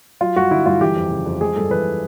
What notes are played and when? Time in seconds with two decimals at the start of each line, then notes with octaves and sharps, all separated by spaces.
0.21 F#3 F4
0.36 G2 F#4
0.51 D3 E4
0.66 G2 F4
0.81 E3 G4
0.96 F2
1.11 C#3
1.26 F2
1.41 G#3 G#4
1.56 G2 A4
1.71 E3 B4